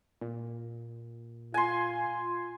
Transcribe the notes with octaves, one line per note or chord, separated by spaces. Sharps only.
A#2
F4 G#5 C6